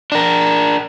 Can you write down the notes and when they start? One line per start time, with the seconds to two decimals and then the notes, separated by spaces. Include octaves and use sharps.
0.12 D4 A#4